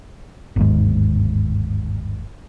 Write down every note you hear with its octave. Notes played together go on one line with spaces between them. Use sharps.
G1 D#2 G#2